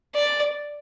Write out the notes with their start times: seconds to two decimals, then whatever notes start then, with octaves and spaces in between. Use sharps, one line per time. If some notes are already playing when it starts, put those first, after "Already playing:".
0.16 D5